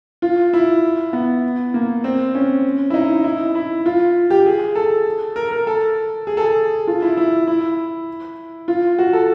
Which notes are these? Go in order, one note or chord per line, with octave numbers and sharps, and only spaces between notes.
F4
E4
B3
A#3
C4
C#4
E4
D#4
E4
E4
F4
G4
G#4
A4
A#4
A#4
A4
G#4
A4
G#4
F4
E4
E4
E4
F4
F#4
A4